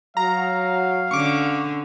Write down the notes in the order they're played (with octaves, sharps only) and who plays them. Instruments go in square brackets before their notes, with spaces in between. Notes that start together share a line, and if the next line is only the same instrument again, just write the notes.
[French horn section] F#3 [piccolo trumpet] F5 [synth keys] A#5
[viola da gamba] D3 C#4 [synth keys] C#6 D6